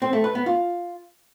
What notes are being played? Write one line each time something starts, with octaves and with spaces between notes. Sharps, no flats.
C4
A3
B4
B3
F4